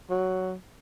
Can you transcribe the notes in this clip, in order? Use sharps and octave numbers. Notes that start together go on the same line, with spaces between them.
F#3